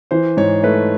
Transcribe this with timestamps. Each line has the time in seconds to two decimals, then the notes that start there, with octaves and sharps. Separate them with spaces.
0.11 E3 C5
0.37 G#2 C#5
0.63 A3 B4